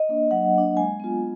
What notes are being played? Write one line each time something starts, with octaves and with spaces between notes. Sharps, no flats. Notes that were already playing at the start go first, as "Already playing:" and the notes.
Already playing: D#5
A#3 D4
F#3 F#5
A#3 D4
G#3 G#5
B3 F4